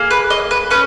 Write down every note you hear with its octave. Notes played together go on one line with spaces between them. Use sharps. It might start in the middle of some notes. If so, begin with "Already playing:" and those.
Already playing: A#3 G#4
B4
D#5
B4
C#4 B4